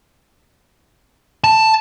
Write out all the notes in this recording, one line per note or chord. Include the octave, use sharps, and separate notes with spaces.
A5